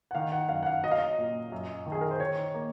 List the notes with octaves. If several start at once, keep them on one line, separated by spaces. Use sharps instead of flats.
F#5
D#3 F5
F#5
F#2 F5
F#5
F5
F#3 D#5
F5
D#5
A#2
F#2
D#3
G#4
A#4
C5
D#3 C#5
A#3